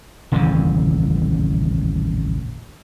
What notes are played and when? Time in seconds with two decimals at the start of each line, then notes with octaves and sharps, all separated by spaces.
0.32 D#1 A1 F2 C#3